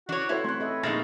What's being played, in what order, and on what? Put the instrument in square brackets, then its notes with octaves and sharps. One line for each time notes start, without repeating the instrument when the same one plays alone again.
[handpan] E3 [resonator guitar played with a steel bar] D4 C#5 [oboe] F#4
[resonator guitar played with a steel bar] E4 [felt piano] F#4 A4 C5 [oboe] C#5
[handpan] A3 C4 [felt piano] C6 F#6
[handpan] A4 D#5 E5
[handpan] A#2 A#3 [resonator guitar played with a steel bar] F3 G#3 D#4 [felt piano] A6